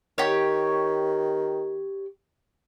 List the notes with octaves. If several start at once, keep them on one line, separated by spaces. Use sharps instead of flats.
D#3 G4 C#5